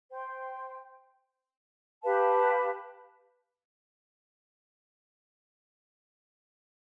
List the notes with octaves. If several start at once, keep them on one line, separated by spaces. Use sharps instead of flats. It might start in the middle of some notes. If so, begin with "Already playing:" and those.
C5 G5 C6
G4 B4 F5 A5